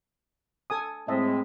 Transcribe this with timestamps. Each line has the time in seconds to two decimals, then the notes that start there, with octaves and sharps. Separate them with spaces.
0.70 A4 G#5 D#6
1.08 A2 G#3 C4 D#5 E5 A5